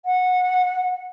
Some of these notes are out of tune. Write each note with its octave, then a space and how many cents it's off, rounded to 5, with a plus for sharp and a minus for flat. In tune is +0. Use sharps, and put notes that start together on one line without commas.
F#5 -20